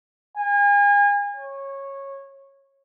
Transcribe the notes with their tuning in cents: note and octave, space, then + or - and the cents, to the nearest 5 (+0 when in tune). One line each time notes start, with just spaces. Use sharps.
G#5 -35
C#5 -15